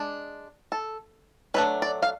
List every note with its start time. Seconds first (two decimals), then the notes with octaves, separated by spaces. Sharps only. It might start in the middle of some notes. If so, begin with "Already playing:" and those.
Already playing: G#3 D4
0.72 A4
1.54 F#3 A3 D4 B4
1.82 D5
2.02 F5